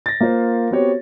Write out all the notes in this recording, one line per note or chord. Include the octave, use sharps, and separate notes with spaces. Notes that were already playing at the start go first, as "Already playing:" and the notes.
A6 A#6
A#3 F4 A#4 C5
B3 C4 F#4 G4 C#5